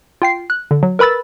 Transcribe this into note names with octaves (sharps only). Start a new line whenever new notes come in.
F4 G5 C7
F#6
D3
F#3
A#4 B4 B5 E6 A6